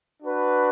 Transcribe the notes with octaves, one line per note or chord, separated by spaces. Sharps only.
D4 F#4 B4